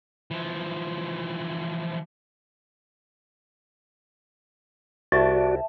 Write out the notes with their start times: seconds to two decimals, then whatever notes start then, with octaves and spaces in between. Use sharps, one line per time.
0.31 E3 F3
5.12 C2 F#4 D5 E5 A5